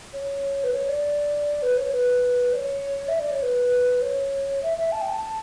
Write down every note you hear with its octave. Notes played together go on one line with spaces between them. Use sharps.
C#5
B4
C#5
D5
B4
C#5
B4
D5
C#5
E5
D5
C#5
B4
C#5
E5
E5
A5
G5
A5